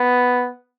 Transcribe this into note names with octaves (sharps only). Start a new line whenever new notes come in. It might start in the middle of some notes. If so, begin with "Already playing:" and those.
Already playing: B3